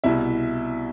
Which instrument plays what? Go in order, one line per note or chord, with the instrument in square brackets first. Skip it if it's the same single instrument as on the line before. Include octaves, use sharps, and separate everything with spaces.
[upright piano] C2 B2 E4 E5